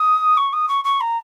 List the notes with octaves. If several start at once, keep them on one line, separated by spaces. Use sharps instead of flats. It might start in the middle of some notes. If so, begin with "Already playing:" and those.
Already playing: D#6
C#6
D#6
C#6
C#6
A#5